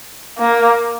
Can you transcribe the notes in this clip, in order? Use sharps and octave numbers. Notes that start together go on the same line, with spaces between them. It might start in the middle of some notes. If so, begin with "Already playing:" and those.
A#3